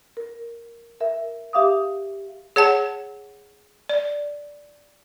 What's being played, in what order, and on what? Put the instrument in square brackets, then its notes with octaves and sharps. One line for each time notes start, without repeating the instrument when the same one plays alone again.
[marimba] A#4
A#4 E5
G4 E5 F5 D6 D#6
[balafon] G#4 C#5 F#5 A5
D5